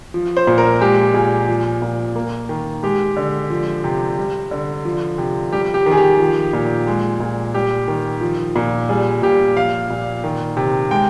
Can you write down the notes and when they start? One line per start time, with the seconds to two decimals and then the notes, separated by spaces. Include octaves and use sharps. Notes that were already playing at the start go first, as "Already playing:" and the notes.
0.14 F3
0.37 C5
0.47 A#2
0.58 A#4
0.81 G#3 G4
1.14 A#2 G#4
1.48 F3
1.82 A#2
2.16 A#3
2.49 D#3
2.83 G#3 G4
3.17 D3
3.50 F3
3.84 C3
4.18 G3
4.51 D3
4.85 F3
5.18 C3
5.52 G3 G4
5.74 G4
5.86 D#3
5.91 G#4
5.97 G4
6.19 F3
6.53 A#2
6.87 G#3
7.20 A#2
7.54 G3 G4
7.88 D#3
8.21 F3
8.56 A#2
8.89 G3 G#4
9.22 A#2 G4
9.56 F3 F5
9.90 A#2
10.24 D#3
10.57 C3
10.91 G#3 G5